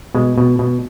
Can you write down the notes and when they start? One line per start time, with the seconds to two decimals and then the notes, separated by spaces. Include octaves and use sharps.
0.15 B2 G#3
0.38 B2
0.59 B2